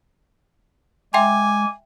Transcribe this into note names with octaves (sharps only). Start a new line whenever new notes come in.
G#3 E5 G5 G#5 C6 D6